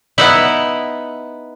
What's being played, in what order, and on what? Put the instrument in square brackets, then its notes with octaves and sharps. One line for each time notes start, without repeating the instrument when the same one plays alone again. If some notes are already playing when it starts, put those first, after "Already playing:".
[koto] B3 D#4 E4